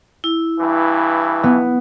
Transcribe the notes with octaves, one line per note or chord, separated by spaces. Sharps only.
E4
G2 E3
B3